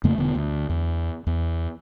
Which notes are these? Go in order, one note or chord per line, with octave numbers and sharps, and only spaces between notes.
F2 C#3 A3 A#3
E1 D3 B3
D2
E2
E2